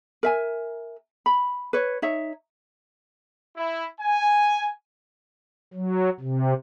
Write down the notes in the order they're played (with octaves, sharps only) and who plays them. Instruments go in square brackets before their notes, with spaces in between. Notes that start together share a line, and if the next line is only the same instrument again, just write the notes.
[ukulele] A#4 E5 G#5
B5
B4 C#5
D#4 C#5 E5
[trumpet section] E4
G#5
[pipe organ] F#3
C3